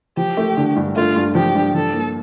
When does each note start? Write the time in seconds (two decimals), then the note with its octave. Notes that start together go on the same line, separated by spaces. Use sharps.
0.17 F3 G4
0.37 A3
0.57 D3
0.76 G2
0.96 A3 F4
1.16 G2
1.35 F3 G4
1.55 G2
1.75 F3 A4
1.94 A#3